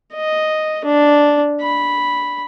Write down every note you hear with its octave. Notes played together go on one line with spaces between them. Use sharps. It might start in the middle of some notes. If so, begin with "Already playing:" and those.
D#5
D4
B5